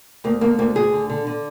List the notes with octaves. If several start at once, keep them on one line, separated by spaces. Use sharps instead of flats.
D2 A#3
D3 A#3
D2 A#3
D2 G#4
D3
D3
D3